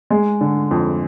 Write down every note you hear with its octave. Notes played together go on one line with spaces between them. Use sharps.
G#3
D3
F2